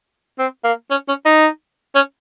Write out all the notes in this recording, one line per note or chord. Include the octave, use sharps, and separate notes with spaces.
C4
A#3
C#4
C#4
D#4
C#4